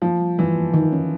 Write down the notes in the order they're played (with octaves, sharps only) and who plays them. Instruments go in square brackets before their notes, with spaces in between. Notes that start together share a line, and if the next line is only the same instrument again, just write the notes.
[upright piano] F3 [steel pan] A#3
[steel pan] G3
[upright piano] E3 [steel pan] G3
[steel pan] A#3
D#3
C#4